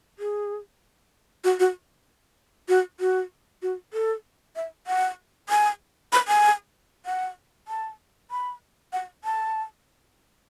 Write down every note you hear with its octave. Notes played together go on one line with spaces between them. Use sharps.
G#4
F#4
F#4
F#4
F#4
F#4
A4
E5
F#5
G#5
B5
G#5
F#5
A5
B5
F#5
A5